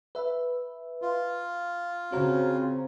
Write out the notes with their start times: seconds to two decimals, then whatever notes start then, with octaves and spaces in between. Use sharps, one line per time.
0.15 B4 E5
1.02 F4
2.12 C#3 C4 F#4 C#5 A#5